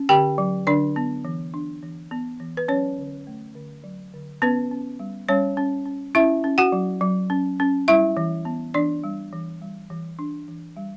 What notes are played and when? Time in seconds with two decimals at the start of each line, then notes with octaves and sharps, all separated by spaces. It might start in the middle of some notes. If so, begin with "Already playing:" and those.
Already playing: C#4
0.09 D3 G4 G5
0.38 F#3
0.67 D3 D4 D5
0.96 B3
1.25 E3
1.54 D4
1.82 E3
2.11 B3
2.40 E3
2.57 B4
2.68 F#3 C#4 C#5
2.98 D3
3.27 A3
3.55 D3
3.84 F#3
4.13 D3
4.42 B3 C#4 B4
4.71 C#4
4.99 G3
5.28 G3 C#4 C#5
5.57 C#4
5.86 C#4
6.15 C#4 E4 E5
6.44 C#4
6.58 F#4 F#5
6.72 F#3
7.01 F#3
7.30 C#4
7.60 C#4
7.88 G3 E4 E5
8.17 E3
8.45 B3
8.74 E3 D4 D5
9.04 G3
9.33 E3
9.62 G3
9.90 E3
10.19 D4
10.48 E3
10.77 G3